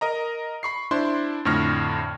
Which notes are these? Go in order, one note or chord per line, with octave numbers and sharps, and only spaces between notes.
A#4 D#5 A#5
B5 C#6 C7
D4 E4 C5 C6
F2 A2 D3 C#6 F6 A#6